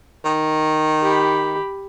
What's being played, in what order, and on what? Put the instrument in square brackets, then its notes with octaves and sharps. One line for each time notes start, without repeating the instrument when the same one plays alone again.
[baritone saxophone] D#3
[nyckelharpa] G4 B5